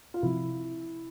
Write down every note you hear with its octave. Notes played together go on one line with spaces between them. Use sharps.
F4
C3 F3 C4 E4